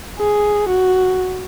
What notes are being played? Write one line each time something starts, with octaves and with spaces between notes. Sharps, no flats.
G#4
F#4